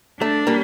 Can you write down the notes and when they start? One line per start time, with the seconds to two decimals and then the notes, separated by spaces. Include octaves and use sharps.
0.21 A3 D4
0.47 G3 A#3